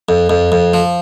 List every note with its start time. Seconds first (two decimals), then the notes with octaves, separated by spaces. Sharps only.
0.09 F2
0.30 F2
0.52 F2
0.74 F3